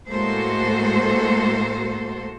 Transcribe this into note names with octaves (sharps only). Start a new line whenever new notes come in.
A2 G#3 A#3 F#4 A4 C5